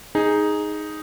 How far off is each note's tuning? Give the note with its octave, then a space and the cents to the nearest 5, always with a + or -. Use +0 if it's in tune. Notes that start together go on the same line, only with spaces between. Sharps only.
D#4 +0 G#4 +0